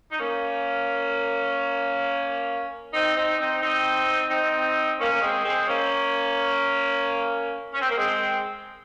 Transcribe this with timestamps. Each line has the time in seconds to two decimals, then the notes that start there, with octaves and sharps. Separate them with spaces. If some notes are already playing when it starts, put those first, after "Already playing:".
0.11 D#4
0.20 A#3 C#4
2.94 C4 D#4
3.17 C4 D#4
3.40 C4 D#4
3.63 C4 D#4
4.31 C4 D#4
5.00 A#3 C#4
5.13 A#3
5.22 G#3 C4
5.45 G#3 C4
5.68 A#3 C#4
7.74 C#4
7.81 C4
7.90 A#3
7.97 G#3 C4